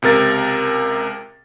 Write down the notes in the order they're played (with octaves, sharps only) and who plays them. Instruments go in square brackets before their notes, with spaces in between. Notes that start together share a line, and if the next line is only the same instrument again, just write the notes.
[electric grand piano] C#2 C3 A#4 A6